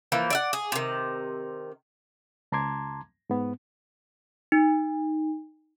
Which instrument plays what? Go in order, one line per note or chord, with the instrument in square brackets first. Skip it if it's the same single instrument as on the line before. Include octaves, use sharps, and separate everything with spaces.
[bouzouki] E3 F3 A#3
D5 E5 F#5
G#4
C3 D#3
[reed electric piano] C#2 A5 A#5 C6 D6 G#6
G#2 B3
[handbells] D#4